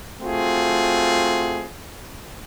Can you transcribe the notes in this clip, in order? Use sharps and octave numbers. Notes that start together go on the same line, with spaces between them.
A3 C4 F4 F#4 G#4